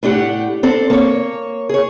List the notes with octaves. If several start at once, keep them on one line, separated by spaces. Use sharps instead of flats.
A2 A3 D4 G4 F#5
C4 D4 A4
A#3 C#5
G#4 C#5